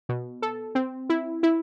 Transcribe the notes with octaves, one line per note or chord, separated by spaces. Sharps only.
B2
A4
C4
E4
E4